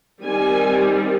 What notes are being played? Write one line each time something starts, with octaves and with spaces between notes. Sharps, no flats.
D#3 G3 C4 G#5